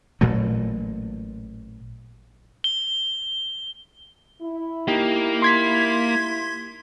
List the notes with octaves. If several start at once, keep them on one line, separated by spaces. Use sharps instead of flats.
A1 A#2 F#3 A3
G7
E4
A#3 D#4 G4
C6 G#6 B6